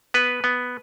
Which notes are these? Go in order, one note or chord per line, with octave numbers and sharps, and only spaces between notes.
B3 B4
B3